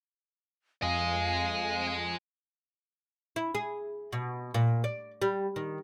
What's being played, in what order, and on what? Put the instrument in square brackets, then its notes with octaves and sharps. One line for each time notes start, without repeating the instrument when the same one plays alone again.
[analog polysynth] F2 [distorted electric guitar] G#4 D#5 [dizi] F5 [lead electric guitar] G#5
[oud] E4
G#4
B2
A#2
D5
G3
D#3